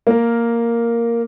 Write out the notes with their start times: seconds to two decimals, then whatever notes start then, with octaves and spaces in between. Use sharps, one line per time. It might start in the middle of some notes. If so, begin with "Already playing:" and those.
0.07 A#3 A#4